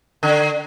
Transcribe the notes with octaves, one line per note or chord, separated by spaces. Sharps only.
D3